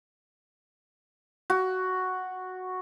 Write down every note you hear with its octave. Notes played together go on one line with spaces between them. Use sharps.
F#4